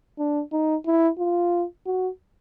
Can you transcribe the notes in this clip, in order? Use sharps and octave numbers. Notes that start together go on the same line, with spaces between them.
D4
D#4
E4
F4
F#4